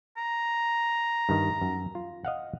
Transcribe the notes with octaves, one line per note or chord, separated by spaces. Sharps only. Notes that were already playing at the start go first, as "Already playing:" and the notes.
A#5
G2 D#3
F#2
F4
D#5 F5 F#5